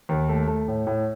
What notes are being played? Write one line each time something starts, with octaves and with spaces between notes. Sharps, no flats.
D#2
A3
A3
A2
A2